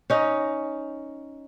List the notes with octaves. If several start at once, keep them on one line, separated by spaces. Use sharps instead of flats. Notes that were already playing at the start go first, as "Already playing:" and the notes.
C#4 D#4